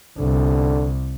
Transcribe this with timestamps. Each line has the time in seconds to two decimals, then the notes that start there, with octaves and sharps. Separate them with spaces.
0.18 C2 D3